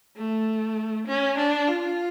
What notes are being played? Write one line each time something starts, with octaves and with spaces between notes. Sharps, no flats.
A3
C#4
D4
F4